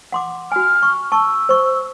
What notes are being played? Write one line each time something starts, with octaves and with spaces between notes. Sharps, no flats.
F#5 C6 D6
F#4 G#5 F6
C#6
A5 C#6 E6
C5 C#6